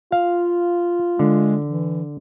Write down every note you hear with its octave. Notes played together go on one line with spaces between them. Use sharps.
F4 F5
D3 G#3
E3